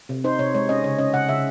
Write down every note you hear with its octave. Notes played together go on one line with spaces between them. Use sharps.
C3
D#4 C5
C3 C#5
G#3 C#5
C#4 D#5
C#3 C#5
C#4 D#5
C#3 F#5
C#3 E5